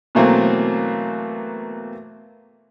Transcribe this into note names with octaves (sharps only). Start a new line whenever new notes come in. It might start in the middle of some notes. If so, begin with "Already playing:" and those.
B2 E3 F#3 A3 A#3 C4